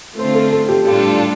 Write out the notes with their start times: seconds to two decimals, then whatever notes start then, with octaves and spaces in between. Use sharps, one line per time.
0.18 D3 A3 C4 F4 C5
0.35 A4
0.52 A4
0.68 G4
0.85 A2 G3 D4 F4 G4 A4